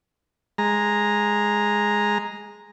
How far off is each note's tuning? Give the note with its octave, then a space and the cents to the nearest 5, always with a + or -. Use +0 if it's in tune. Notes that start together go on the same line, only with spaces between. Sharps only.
G#3 +0 A#5 +0